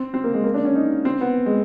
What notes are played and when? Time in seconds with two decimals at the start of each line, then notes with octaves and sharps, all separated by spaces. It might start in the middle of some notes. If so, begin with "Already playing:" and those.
Already playing: C4
0.14 C4
0.24 A#3
0.34 G#3
0.44 A#3
0.54 D4
0.65 C#4
0.75 D#4
1.05 C4
1.21 B3
1.46 G#3